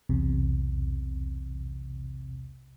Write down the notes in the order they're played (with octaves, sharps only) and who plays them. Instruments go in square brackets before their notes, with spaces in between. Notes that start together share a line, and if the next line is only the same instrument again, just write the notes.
[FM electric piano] B1 E2 C3